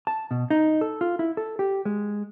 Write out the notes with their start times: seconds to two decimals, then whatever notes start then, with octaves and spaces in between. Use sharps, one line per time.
0.07 A5
0.31 B2
0.50 D#4
0.81 A4
1.01 F4
1.19 E4
1.37 A4
1.59 G4
1.85 G#3